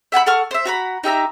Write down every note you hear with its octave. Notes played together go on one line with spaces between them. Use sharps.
E5 F#5 G#5 B5
A4 F#5 C#6 F6
C5 E5
F#4 A#5 B5
D#4 G4 E5 A#5